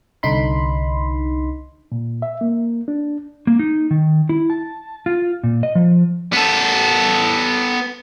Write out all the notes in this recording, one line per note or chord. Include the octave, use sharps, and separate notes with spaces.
C2 D3 D#4 B5 C6
A#2
E5
A#3
D4
A#3
D#4
D#3
E4
A5
F4
A#2
D#5
F3
B3 A4